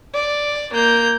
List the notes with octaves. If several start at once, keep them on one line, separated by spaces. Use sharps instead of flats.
D5
A#3 G6